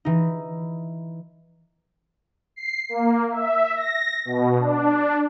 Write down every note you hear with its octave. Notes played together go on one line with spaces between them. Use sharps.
E3 D#4
C7
A#3
E5
A#6
B2
D4